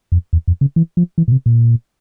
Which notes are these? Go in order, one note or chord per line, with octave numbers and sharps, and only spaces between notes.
F2
E2
F2
C#3
E3
F3
E3
A#2
C3
A#2